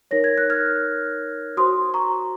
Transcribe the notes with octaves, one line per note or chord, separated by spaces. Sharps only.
D#4 A#4 C#5 A#6
G#6
F#6
F6 G#6
F#4 C5 C6 D#6
A#5 C#6